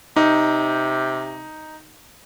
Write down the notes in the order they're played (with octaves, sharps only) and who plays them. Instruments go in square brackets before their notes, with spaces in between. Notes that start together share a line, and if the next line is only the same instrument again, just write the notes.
[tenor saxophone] C3 [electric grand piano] D#4